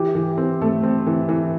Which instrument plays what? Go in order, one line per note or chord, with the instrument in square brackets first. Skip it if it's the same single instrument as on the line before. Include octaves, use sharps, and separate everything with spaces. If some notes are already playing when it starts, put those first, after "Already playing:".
Already playing: [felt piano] E3 [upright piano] G4
[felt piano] E3
C4
A3
C4
E3
E3